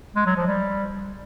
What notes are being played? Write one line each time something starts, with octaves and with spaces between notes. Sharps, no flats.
G#3
F#3
F3
G3